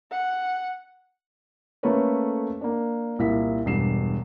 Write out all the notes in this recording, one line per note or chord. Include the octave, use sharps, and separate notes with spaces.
F#5
A3 A#3 C#4 A4 B4 C#5
A#3 D4
C2 A#2 A#3 E4 B6
E1 G2 C7 E7